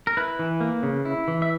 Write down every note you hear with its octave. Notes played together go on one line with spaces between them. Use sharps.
A#4
E4 B4
E3
A#3
C#3
E4
E3
E5